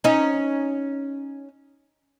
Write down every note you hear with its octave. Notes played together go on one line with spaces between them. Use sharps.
C#4 D#4